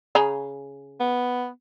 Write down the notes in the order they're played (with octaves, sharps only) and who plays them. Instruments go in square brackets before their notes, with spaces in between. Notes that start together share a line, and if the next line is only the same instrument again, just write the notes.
[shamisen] C#3 G#4 A#5
[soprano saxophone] B3